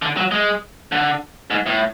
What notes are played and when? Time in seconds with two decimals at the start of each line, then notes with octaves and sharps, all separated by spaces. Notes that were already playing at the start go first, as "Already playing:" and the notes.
0.02 D3
0.17 F#3
0.31 G#3
0.92 D3
1.50 G#2
1.66 A2